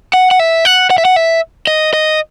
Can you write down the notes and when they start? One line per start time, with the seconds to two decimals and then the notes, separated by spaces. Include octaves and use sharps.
0.14 F#5
0.31 F#5
0.39 E5
0.65 F#5
0.90 F#5
0.98 E5
1.05 F#5
1.16 E5
1.67 D#5
1.93 D#5